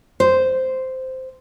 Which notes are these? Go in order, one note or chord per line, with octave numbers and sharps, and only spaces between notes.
C5